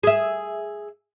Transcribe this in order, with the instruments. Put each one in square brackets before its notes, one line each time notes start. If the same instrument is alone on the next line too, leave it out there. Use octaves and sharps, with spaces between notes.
[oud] G#4 E5